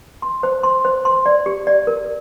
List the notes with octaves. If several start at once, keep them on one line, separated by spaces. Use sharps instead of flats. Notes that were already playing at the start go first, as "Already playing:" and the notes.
C6
C5
C6
C5
C6
D5
G4
D5
A#4